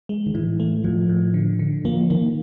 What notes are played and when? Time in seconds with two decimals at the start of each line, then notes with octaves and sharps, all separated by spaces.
0.09 G#3
0.26 D#3
0.34 A2 E3
0.60 A3
0.84 A2 F3
1.09 A2
1.34 D3
1.59 D3
1.85 F3 A#3
2.10 D#3 A#3